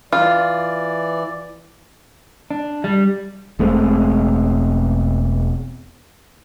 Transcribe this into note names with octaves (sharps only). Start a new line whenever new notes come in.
E3 F4 D5
D4
G3
E1 G#3 A3 C4